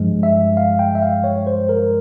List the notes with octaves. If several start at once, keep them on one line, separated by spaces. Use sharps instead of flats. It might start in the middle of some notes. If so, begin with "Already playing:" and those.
Already playing: G2 F3 G#3
E5
F5
G5
E5
F5
C#5
C5
A#4